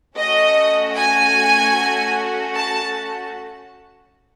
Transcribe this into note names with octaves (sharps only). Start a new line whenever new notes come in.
A3 C#4 F#4 D#5
G#5
A5